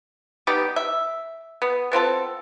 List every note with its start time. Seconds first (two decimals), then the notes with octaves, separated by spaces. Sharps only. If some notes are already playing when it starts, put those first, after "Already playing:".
0.47 G3 B3 D#4 G4
0.76 E5
1.62 B3
1.92 B3 C4 F4 A4